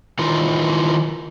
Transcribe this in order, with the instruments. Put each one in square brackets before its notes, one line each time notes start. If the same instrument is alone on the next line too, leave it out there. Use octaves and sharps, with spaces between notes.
[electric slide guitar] D#3 E3 D#4 F4